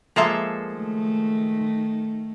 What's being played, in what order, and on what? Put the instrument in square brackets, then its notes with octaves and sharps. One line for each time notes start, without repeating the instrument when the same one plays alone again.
[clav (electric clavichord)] F3 G#3 F5 [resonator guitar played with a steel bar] A#3 A4 E5
[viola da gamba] D#3 A3